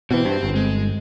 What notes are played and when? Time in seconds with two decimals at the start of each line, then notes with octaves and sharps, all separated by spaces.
0.11 B2 E3 C4 C5
0.25 G2
0.43 G1
0.55 G#3